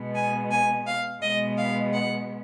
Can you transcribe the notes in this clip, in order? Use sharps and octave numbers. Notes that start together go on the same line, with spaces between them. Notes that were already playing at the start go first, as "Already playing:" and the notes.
Already playing: B2 G#3 B3
G#5
G#5
F5
B2 G#3 B3 D#5
F5
F#5